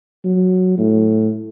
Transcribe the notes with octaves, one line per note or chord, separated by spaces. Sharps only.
F#3
A2